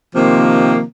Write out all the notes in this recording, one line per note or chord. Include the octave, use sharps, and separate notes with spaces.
C3 D#3 F3 A#3